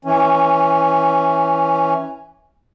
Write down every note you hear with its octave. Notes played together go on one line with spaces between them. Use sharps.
E3 C#4